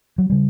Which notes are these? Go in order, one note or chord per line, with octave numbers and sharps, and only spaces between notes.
F#3
C#3 G3